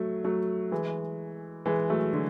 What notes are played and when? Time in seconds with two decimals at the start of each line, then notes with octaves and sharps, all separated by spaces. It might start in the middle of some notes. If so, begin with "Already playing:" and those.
Already playing: F#3 A3
0.24 F#3 A3
0.72 E3 G#3
1.66 E3 G#3
1.90 F#3 A3
2.13 D3 F#3